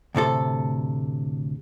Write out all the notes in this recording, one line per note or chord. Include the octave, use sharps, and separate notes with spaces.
D2 A2 C3 A4